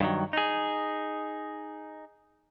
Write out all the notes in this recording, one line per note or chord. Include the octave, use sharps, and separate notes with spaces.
G2 D#3 F#3
D#4 G#4